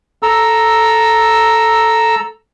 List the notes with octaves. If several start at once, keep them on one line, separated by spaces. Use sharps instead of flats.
A4 A#5 E6